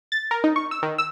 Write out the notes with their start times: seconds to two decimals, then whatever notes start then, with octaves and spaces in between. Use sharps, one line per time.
0.12 A6
0.31 A#4
0.44 D#4
0.56 C#6
0.71 E6
0.83 D#3
0.98 E6